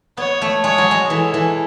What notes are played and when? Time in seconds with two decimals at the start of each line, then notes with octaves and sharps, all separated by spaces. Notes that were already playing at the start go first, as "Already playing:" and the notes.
0.17 B3 C#5
0.42 A3
0.64 G#3 C#5
0.78 F#3
0.91 G#3
1.10 E3 A4
1.34 E3